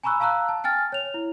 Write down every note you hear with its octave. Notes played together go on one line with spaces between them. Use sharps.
G#5 A#5 B5 C#6 E6 F#6
F5 A5 A#5 E6 F#6
A5
G5 G#5 F6 A6
C#5 F7
E4